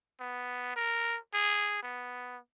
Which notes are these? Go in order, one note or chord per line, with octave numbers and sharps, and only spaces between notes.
B3
A#4
G#4
B3